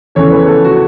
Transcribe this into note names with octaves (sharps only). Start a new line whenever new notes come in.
E2 C#3 E3 A3 C#5
B4
A4
F#4